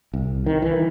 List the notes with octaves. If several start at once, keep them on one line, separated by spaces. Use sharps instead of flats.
C2
D#3
E3